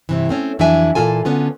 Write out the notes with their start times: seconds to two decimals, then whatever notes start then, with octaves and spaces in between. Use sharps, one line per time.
0.09 G2 C3 E3
0.29 A3 C4 C#4
0.59 F2 E3 F#3 D4 E5 G#5
0.95 A#2 E3 F4 A4 G#5
1.25 D3 B3 C#4 F4